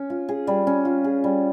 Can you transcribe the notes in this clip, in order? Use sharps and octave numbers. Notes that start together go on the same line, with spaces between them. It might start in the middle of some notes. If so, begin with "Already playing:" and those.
Already playing: C#4
F4
G#4
G3
C#4
F4
G#4
G3